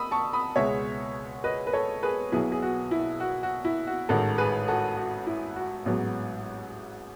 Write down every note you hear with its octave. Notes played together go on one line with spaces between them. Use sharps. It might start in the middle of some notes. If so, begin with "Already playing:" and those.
Already playing: B5 D#6 E6
A5 C#6
B5 D#6
C#2 B2 G#3 B3 C#5 E5
B4 D#5
B4
A4 C#5
G#4 B4
B1 B2 F#3 B3 E4 G#4
G#4
F#4
E4
F#4
F#4
E4
F#4
A1 G#2 D#3 F#4 A4
G#4 B4
F#4 A4
F#4
E4
F#4
A1 G#2 F#3 B3